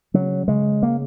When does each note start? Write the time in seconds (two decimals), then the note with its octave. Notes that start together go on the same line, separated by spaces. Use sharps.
0.14 C#3 F#3
0.48 C#3 G#3
0.83 A#3